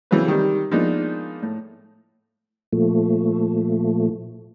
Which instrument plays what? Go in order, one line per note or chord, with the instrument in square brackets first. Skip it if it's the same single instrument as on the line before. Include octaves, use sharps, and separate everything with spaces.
[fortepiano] C#3 E3 F#3 C4 F4 B4
C3 D#3 G3
F3 G#3 A#3 B3 D4 D#4
A2
[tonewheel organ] A#2 F3 A3